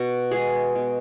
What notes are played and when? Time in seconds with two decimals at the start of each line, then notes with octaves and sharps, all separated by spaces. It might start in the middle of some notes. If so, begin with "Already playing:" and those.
Already playing: B2 F#4
0.31 G#3 B3 G#4
0.75 B2